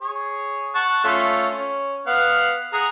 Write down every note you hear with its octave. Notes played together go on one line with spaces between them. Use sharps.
G#4 C#5
F#5 A5 C#6
A3 C#4 F4
C#4
B3 F5 F#5
G#4 F#5 A#5